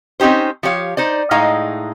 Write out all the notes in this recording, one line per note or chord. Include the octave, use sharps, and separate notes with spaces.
C4 C#4 D#4 G4 C5
F3 G4 C#5 F5
D#4 C5 D5
A2 G#3 D#4 F5 A#5